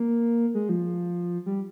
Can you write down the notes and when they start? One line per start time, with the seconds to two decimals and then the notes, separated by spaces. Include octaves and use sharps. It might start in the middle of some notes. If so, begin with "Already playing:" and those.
Already playing: A#3
0.54 G#3
0.69 F3
1.46 G3